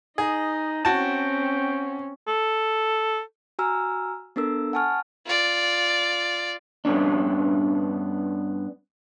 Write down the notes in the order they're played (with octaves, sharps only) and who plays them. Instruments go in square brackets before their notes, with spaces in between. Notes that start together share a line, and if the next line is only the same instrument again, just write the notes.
[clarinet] D#4 [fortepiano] G#4 [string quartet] D#5
[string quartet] C4 C#4 [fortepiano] F#4 A5 [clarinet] G5
[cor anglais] A4
[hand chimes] F#4 G#5 A#5 E6 F6
B3 D4 A4 A#4 E6
F#5 G#5 A5 C#6 F6
[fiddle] F4 D5
[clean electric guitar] G2 B3 C#4 D4